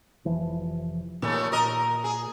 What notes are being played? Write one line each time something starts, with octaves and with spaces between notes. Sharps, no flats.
F1 E3 F3
D#2 A#2 G#3 A3
A#4 D#5
G#4